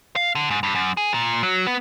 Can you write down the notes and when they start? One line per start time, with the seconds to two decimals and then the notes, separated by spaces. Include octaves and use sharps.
0.16 F5
0.35 D3
0.50 G#2
0.63 G2
0.75 F#2
0.97 G#4
1.14 A#2
1.43 F#3
1.67 B3